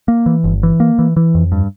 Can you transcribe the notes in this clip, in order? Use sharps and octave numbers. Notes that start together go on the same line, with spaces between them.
A#3
E3
G1
E3
A#3
E3
E3
F2
G2